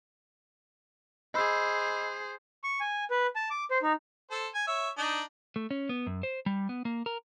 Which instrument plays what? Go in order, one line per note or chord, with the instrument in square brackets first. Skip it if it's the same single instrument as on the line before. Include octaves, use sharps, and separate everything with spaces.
[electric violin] G#4 C5 [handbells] D#5 B5 E6
[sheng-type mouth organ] C#6
G#5
B4
A5
D6
C5
D#4
[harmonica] A4 C5
G#5
C#5 E5
D4 D#4 D#5
[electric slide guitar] A3
C#4
B3
F#2
C5
G3
B3
A#3
A#4